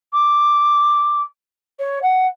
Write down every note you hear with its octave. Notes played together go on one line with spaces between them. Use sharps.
D6
C#5
F#5